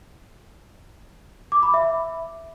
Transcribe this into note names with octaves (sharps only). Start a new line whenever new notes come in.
D6
B5
E5